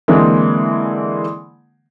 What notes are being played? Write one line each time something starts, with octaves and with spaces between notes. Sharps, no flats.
D3 E3 G#3 A#3 C4